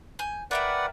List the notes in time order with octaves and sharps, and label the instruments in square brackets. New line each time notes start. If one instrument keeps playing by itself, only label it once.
[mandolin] G#5 G6
[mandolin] A#4 E5 G5 [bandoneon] B4 D5 F#5